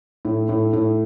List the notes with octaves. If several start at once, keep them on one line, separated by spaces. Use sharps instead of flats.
A2
A2
A2